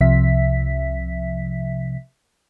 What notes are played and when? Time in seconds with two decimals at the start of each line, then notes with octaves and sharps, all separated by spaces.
0.01 C2 C3 F3 E5 B6